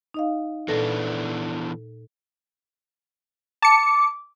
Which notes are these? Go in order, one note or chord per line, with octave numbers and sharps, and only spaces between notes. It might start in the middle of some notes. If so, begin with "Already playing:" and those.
D#4 D#5 F5
A#2 E3 B3 D4 A4 A#6
A5 D6 C#7